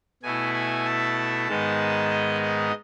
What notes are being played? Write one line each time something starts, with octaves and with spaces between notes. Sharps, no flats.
B2 A3 E4 G#5
G#5
A5
G#2 D#3 G#3 B3 D#4
D#5
D#5